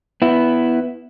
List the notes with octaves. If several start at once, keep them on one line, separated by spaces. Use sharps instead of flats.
B3 E4